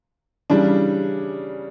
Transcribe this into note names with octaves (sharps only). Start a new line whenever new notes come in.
C#3 E3 G3 D4